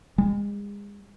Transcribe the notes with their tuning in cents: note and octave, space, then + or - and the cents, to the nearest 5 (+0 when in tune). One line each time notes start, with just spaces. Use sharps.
G#3 -35